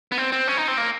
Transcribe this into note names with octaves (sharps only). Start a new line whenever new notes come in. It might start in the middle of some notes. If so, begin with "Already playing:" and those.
B3
C4
C4
C#4
D#4
C4
A#3